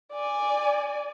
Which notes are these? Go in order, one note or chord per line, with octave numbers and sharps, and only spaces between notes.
D5 G#5